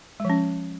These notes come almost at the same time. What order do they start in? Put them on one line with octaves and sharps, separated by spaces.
G#3 F3 C#4